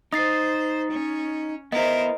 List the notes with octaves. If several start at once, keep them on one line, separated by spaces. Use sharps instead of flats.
D#4 C5 D#6 A6 C7
C#4
B3 E4 A#4 C5 D#5